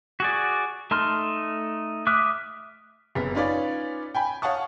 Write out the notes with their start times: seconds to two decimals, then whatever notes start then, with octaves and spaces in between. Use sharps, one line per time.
0.20 F#4 G#4 D5
0.91 A3 D#4 A5 C6 F6
2.07 E5 D6 D#6 F6 F#6
3.15 F#1 B3 B6
3.35 C#4 D#4 F4 B4 C#5 D5
4.15 G5 G#5 B5
4.42 C#5 F5 F#5 A5 C#6 D#6